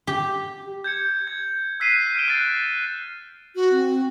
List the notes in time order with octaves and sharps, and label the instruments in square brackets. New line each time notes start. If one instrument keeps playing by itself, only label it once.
[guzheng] G4
[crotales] G6 G#6 C#7
G#6
E6 F#6 B6 C7 D#7
F6 B6 D7 E7 G7
F#6 G6 A6 C7
[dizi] F#4
[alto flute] C4